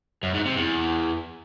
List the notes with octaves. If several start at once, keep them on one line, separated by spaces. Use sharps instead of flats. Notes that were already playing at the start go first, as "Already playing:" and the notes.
F#2
G#2
C3
E2